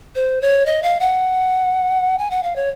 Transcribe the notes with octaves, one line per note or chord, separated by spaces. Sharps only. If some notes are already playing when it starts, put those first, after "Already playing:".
C5
C#5
D#5
F5
F#5
G#5
F#5
F5
C#5